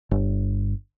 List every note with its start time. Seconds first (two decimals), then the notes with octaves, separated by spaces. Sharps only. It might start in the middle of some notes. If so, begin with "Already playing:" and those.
0.11 G1